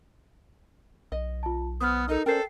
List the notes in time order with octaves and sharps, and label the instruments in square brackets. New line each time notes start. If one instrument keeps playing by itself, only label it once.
[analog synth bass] B1 [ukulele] D#5
[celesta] F4 A5
[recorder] B3 [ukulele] C5 [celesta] D#6 F6
[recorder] D#4 [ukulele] A4 D#5 [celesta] A#4
[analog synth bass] C#4 [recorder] A4 [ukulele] A#4 C5 D5 [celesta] G5 C7